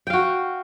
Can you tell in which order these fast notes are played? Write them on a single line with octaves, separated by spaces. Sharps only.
G5 F5 F#4